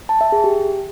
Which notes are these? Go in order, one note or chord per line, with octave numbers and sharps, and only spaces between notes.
A5
E5
G#4
G4